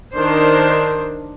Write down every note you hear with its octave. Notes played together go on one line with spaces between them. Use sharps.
D#3 D4 C5